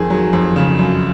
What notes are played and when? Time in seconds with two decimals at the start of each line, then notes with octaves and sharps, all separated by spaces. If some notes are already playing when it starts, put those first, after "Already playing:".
Already playing: F2 D#3 G#4
0.10 F#3
0.33 F2
0.56 C#3
0.79 F#2